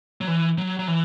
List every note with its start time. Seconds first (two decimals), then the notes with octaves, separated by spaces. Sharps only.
0.21 F#3
0.27 E3
0.58 F#3
0.79 F#3
0.88 E3